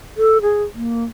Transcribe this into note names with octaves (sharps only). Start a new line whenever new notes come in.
A4
G#4
A#3